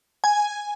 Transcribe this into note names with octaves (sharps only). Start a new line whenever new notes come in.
G#5